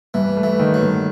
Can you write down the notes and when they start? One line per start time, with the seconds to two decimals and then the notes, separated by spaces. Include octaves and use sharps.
0.14 G2 E3
0.37 A3
0.43 E3
0.59 D#3
0.74 F#3
0.82 G2